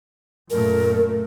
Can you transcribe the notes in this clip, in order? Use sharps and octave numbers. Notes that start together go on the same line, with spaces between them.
F#2 A#2 A3 A#4